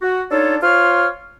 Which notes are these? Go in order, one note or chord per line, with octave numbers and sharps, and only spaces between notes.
F#4
D4 D#4 F4 A4 C#5
F4 C5 C#5 C6 F6